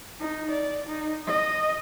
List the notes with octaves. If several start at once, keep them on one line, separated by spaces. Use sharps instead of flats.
D#4
D5
D#4
D#5